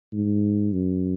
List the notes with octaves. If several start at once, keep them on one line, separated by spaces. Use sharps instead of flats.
G#2
F#2